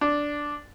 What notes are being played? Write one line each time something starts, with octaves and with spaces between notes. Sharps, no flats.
D4